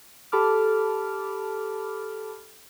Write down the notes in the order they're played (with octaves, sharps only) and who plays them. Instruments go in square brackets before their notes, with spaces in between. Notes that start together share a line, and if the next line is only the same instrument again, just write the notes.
[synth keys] G4 A4 A5 B5 D6 F6